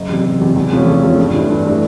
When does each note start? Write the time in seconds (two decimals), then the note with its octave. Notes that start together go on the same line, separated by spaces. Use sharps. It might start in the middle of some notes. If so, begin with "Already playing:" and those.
Already playing: F#1
0.09 E2 C3
0.25 F#1
0.40 E2 C3
0.56 E2
0.71 C3 F3 A3 C#4
0.87 E2
1.03 C3 F3 A3 C#4
1.19 G2
1.34 E3 A3 D4
1.50 G2
1.65 E3 A3 D4